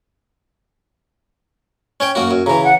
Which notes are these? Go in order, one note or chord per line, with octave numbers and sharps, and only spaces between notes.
C#4 C#5 G5
F#2 A#3 F#4
F#2
C#3 E3 A#5
F#5